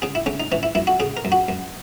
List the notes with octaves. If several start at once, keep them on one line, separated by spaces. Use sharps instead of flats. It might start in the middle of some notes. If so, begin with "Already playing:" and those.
C#3 G#4
E4
C#3 C#4
D#4
E3 C#4
E4
F#2 E4
F#4
C#3 G#4
A#4
F#2
F#4
F#2